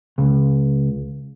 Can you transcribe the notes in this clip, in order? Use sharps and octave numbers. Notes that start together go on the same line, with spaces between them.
C#2